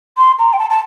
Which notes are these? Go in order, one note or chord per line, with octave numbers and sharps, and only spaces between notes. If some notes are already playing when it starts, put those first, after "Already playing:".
C6
A#5
G5
A5
A5